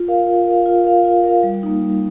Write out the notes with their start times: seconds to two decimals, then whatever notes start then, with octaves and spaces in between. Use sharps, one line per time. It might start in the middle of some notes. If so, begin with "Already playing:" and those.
Already playing: F4
0.08 A#4 F5
0.27 F4
0.47 A#4 F5
0.66 F4
0.85 A#4 F5
1.05 F4
1.24 A#4 F5
1.43 G3
1.63 A#3 D#4
1.82 G3